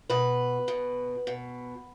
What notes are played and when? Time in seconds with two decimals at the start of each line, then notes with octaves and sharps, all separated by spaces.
0.10 B2 B4
0.68 B2
1.27 B2